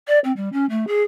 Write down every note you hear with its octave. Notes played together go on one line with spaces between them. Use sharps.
D5
C4
G3
C#4
A3
G#4